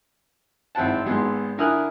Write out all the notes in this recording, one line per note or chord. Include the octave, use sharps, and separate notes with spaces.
G#1 C4 E4 F#5 A5
G#1 G#3 B3 C6
D3 E4 A#4 G#5 D#6 F#6